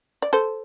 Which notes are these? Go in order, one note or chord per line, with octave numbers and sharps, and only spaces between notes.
D5
A4 C5